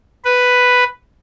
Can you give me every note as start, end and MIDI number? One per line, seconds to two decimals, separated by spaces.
0.25 0.84 71